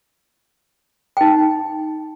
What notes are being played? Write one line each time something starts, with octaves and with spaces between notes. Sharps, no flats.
D#4 G5